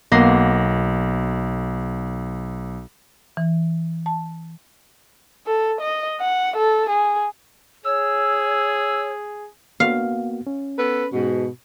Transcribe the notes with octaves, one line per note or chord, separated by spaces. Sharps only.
B1 A#3 B3 C6 A#6
E3
A5
A4
D#5
F#5
A4
G#4
G#4 C#5 E6
A#3 B3 F#4 F5
C#4
B3 A4 B4
G#2 B2